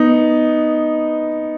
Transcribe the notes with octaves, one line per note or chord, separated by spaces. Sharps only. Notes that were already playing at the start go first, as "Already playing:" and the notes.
Already playing: B3 D#4